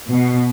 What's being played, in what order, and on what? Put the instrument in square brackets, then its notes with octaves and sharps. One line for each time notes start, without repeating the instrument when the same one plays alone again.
[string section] B2